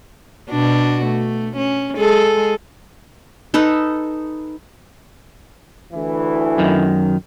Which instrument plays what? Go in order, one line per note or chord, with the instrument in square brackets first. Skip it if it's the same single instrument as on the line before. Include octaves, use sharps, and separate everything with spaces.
[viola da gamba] B2 D4 F#4
A3
C#4
G#3 G#4 A4
[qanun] D#4 A4 B4
[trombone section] D2 E3
[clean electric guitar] F#2 D#3